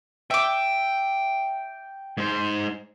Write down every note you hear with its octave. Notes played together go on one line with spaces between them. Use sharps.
E5 G5 D6
G#2 C5